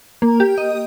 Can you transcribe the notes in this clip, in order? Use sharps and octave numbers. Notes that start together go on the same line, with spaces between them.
A#3
G4
D#5